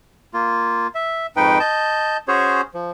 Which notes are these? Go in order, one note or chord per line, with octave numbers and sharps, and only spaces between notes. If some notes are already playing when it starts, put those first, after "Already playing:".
A#3 F4
E5
F2 G#2 D#4 B4 G5
D#5 A5 G6
C#4 F#4 G#4 C5 C#5
F3